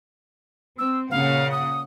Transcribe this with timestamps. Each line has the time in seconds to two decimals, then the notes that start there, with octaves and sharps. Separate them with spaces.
0.78 C4 E6
1.11 A#2 C#3 F5 F#5
1.51 D#6